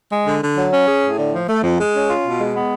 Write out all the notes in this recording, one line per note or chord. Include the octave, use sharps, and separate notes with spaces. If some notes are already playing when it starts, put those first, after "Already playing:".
G#3
D3
D3
F#3
C#4
G#4
A2
D3
F3
A3
F2
G#3
C#4
F4
B2
G#3
B3